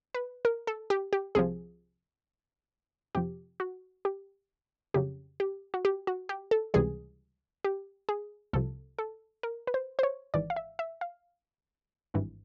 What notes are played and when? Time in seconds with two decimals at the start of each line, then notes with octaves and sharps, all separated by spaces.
0.14 B4
0.45 A#4
0.67 A4
0.90 G4
1.13 G4
1.35 C2 C3 F3 G#4
3.15 F2 C3 F3 G4
3.60 F#4
4.05 G4
4.94 F2 C#3 F#3 G4
5.40 G4
5.74 F#4
5.85 G4
6.07 F#4
6.29 G4
6.51 A4
6.74 C#2 C3 E3 G3 G#4
7.64 G4
8.09 G#4
8.53 C2 C3 F3 A4
8.99 A4
9.43 A#4
9.67 B4
9.74 C5
9.99 C5
10.03 C#5
10.34 G#1 G#2 E3 D5
10.50 F5
10.56 E5
10.79 E5
11.01 F5
12.14 G#1 G2 E3